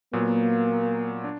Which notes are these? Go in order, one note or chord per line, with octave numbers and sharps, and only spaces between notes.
A#2 F#3 A#3 B3
D4